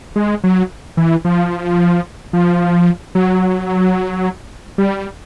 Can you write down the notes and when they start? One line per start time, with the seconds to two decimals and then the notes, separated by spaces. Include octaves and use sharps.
0.16 G#3
0.44 F#3
0.97 E3
1.25 F3
2.33 F3
3.15 F#3
4.78 G3